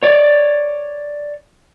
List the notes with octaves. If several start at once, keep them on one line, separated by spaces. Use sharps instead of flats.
C#5 D5